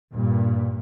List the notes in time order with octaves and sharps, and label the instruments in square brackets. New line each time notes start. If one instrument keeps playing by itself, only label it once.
[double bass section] G2 A#2